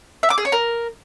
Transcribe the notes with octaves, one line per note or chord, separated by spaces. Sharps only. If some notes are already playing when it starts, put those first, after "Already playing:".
E5
D6
G#4
C#5
A#4